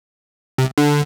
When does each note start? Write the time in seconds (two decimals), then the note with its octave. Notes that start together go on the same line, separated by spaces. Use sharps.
0.58 C3
0.78 D3